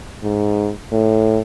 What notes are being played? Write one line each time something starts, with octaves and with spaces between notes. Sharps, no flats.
G#2
A2